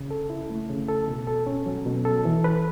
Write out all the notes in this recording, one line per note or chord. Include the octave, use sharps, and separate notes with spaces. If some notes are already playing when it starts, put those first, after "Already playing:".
Already playing: C#3
A4
E4
A3
C#3
A4
B2
A4
C#4
F#3
B2
A4
E3
B4